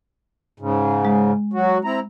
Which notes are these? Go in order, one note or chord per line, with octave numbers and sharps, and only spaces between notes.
G#2 C#3
G#3
F#3 F#4
C4 E4 A#5